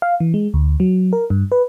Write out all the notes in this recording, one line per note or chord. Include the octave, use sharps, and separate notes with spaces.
F5
E3
G#3
D2
F#3
A#4
G2
B4